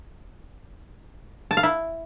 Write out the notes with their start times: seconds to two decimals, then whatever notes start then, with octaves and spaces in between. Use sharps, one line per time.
1.51 A5
1.57 F5
1.63 E4